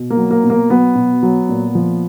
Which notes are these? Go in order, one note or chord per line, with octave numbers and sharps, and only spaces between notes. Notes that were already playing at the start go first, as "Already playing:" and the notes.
Already playing: B2
A#3
F#3
A#3
B2
A#3
F#3 B3
B2
F#3
A#2
F3